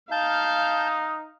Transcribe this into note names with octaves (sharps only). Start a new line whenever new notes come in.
D#4 F5 A5 G6